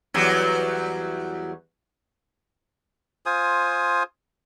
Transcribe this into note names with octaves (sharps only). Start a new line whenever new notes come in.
E2 F#3 G3
F4 C5 G#5 D#6